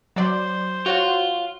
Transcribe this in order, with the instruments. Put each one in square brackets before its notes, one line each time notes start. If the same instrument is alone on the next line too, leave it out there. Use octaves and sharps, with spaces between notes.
[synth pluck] F#3 D5 [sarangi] C5
[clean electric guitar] F4 [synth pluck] F#4 C#5 F#5